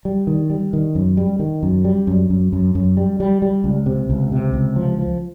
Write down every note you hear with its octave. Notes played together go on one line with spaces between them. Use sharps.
G3
D#3
G3
D#3
F#2
G3
D#3
F#2
G3
F#2
F#2
F#2
F#2
G3
G3
G3
C#2
C3
C#2
C3
C#2
F3
F3